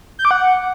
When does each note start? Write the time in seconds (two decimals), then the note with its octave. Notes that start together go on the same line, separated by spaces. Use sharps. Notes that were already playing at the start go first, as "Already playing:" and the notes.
0.19 G6
0.25 D6
0.31 F#5